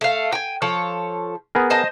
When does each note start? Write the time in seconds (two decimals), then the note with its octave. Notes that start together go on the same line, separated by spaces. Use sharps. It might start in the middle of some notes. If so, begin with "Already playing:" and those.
0.01 A3 F5
0.32 G5 G#5
0.62 F3 A4 C#5
1.55 B3 G#4 A#4
1.70 C5 D#5 A5